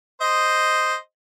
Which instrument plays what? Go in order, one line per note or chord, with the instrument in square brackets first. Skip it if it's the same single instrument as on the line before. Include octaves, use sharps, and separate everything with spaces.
[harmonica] C5 D#5